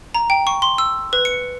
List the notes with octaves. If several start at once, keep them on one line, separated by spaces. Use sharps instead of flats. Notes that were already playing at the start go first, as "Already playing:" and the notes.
A#5
G5
C#6
C6
E6
B4
C#7